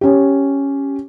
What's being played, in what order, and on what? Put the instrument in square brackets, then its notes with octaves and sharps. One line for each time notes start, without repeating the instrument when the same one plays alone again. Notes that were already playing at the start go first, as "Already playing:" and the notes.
[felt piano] C#4 G4